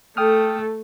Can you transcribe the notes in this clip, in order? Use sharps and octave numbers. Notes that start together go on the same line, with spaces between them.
A3 A4 G5 D#6 F6